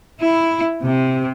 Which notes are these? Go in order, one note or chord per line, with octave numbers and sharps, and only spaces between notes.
E4
C3